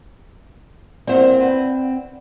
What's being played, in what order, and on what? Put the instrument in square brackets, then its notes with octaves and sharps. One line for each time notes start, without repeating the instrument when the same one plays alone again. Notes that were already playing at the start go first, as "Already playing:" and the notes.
[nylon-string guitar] A#3 E4 C5 [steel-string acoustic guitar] C4 [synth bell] D5 F#5
[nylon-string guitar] B4